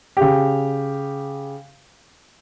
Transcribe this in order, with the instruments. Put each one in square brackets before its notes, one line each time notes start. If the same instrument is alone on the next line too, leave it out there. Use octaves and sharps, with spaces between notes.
[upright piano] C#3 G4